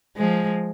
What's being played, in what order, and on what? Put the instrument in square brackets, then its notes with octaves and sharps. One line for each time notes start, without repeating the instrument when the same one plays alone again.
[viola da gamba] F3 G#3